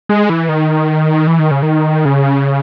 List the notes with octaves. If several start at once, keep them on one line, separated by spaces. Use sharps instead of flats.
G#3
E3
D#3
E3
D#3
C#3
D#3
C#3